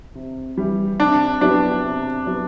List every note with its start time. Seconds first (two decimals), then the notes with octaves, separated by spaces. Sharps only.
0.15 C3
0.57 E3 G3
1.00 C3 D4
1.41 F#3 B3 D4 E4 G4
1.84 C3
2.26 F#3 B3 E4 G4